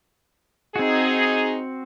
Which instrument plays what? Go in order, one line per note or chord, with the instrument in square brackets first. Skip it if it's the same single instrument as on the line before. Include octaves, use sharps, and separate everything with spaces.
[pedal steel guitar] C4 F#4 [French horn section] D#4 G#4